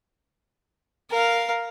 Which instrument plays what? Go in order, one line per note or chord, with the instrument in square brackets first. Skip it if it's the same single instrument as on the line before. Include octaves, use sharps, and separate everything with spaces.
[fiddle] A#4 F5